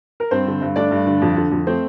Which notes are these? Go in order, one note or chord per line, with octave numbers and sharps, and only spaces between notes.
A#4
G2 C4 C5
D3
G2
A3 D4 D5
G2
D3
F2
D3
F2
A3 C4 C5